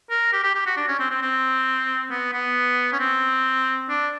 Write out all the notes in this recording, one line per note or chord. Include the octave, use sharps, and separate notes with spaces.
A#4
G4
G4
G4
F#4
D4
C#4
C4
C4
C4
B3
B3
C#4
C4
D4